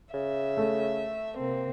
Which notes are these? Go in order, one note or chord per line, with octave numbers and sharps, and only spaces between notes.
C#3 E5
A3
C3 A#3 C4